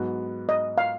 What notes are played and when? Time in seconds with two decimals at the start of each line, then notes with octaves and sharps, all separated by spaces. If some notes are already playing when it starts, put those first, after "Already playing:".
Already playing: G#2 F#3 B3 F#4
0.49 D#5
0.78 F5